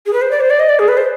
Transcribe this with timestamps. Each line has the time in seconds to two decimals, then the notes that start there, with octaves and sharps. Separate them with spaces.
0.06 G#4
0.13 B4
0.22 C5
0.31 D5
0.40 C5
0.50 D5
0.60 D#5
0.69 D5
0.79 G#4
0.88 B4
0.97 C5